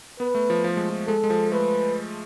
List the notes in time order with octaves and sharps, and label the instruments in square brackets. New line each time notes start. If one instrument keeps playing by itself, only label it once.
[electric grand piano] B3 [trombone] B4
[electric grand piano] A3
F3
F3
G#3
F3
[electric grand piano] G#3 [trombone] A4
[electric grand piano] G#3
F3
[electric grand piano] A3 [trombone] B4